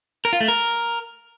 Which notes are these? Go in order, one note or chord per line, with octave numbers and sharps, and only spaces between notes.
A#4
F4
A3
A#4